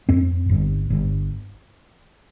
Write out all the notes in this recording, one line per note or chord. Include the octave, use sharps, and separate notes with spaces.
F2 C4
G1
G1